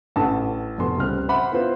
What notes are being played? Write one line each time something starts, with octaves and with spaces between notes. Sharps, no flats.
A1 A4 F#5 A5
F1 F2 B2 A4 C6
C#2 G3 C4 F6 F#6
C5 E5 F#5 B5 C6
B3 E4 F4 B4 C5